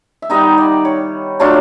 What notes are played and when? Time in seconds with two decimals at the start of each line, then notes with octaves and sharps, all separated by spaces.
0.22 E5
0.30 D#3 G3 B3 D#4 D#5
0.58 D5
0.85 C#5
1.40 F#3 A3 D4 F4 D5